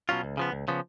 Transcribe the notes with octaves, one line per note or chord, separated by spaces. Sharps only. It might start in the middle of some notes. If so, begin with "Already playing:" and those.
B2 F#3 C#4 F4
C#2
C#3 F3 B3
C#2
C#3 F3 B3